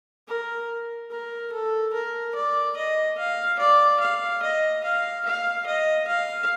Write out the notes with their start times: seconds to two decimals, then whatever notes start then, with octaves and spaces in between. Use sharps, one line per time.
0.28 A#4
1.11 A#4
1.52 A4
1.93 A#4
2.35 D5
2.77 D#5
3.18 F5
3.59 D5
4.00 F5
4.42 D#5
4.84 F5
5.25 F5
5.67 D#5
6.08 F5